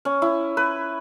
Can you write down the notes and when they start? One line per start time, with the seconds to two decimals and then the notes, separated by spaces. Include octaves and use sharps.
0.05 C#4
0.22 E4
0.57 B4